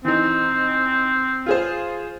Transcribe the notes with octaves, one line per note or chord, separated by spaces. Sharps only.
E3 C4 D#4
F4 G#4 C5